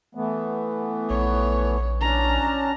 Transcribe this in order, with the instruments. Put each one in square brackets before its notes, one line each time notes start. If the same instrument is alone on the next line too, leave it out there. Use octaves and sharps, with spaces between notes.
[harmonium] E3 A3 B3
[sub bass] A#1 [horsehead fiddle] C#5
[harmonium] C#4 D4 A5 [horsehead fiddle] A#5